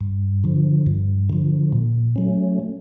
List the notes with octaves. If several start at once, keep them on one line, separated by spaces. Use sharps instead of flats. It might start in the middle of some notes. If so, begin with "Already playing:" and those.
G2
D3 F3
G2
D3 F3
A#2
F#3 A3 C#4